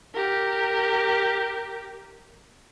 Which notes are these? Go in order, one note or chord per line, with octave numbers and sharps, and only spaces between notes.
G4 A#4